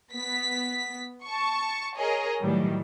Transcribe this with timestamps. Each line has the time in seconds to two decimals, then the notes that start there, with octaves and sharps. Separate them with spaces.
0.13 B3 B6
1.25 A5 C#6
1.97 G#4 A#4 C#5 D#5
2.41 A2 D#3 E3 F#3 G3